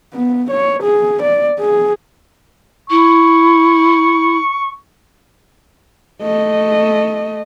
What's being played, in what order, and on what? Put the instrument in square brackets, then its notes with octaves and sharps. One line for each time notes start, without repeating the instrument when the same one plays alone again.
[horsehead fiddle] B3
C#5
G#4
D5
G#4
[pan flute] E4 [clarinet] C#6
[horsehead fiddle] A3 D#5